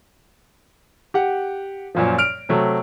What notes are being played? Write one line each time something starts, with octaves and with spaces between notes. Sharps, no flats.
G4 F#5
F#2 A#2 F3
F6 D7 F7
C3 F#3 A3